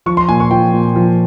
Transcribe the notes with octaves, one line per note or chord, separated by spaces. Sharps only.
F3 C#6
C6
A#2 G#5
C#6
F3 G5
A#2
F3